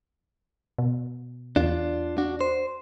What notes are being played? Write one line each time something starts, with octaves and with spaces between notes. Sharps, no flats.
B2
E2 D4 F4
D4 F#4
C5